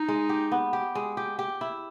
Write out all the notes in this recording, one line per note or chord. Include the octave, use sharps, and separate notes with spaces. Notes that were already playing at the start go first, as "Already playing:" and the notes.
Already playing: D#4
G#3
G4
B3
G4
G#3
G4
G4
E4